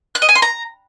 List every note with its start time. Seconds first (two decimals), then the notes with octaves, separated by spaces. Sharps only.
0.15 F#6
0.22 D#5
0.29 G#5
0.35 C6
0.42 A#5